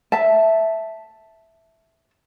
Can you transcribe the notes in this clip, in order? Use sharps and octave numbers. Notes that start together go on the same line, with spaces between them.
E5 A5